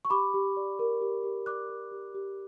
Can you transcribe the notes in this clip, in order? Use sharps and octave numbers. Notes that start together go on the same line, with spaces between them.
C#6
G4 B5 D6
G4
D5
A#4
G4
G4
D5 D6 F#6
A#4
G4
G4